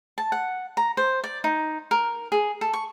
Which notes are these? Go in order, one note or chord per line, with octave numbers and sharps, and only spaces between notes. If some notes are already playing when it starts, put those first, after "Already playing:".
A5
F#5
A#5
C5
D5
D#4
A#4
G#4
A4
C#6